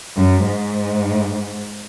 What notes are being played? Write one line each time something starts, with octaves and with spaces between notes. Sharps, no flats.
F#2
G#2